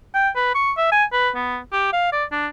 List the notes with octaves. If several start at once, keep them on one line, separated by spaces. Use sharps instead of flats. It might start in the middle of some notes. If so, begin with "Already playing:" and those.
G5
B4
C#6
E5
G#5
B4
B3
G4
F5
D5
D4